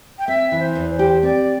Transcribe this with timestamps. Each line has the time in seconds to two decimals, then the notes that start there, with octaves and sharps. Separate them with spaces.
0.19 G5
0.28 C4 E5
0.52 E3
0.59 C5
0.75 E2
0.91 C5
0.99 G4
1.22 C4 D5